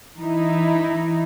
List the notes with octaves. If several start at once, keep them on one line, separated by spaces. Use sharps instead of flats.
E3 D#4 E4